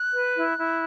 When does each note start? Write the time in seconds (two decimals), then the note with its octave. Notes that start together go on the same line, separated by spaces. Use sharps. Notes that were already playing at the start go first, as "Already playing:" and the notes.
Already playing: F#6
0.14 B4
0.36 E4
0.59 E4